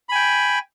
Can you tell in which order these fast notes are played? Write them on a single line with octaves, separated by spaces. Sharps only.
B5 G#5 G5